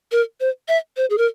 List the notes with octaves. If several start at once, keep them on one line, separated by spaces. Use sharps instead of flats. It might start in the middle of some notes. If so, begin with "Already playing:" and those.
A#4
C5
E5
C5
G#4
A#4